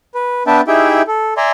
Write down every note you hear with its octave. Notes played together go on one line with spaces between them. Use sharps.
B4
B3 D4 B4 E5 G5 A5
D#4 E4 G4 G#4 E5 G5
A4
D5 E5 G#5 A#5 C6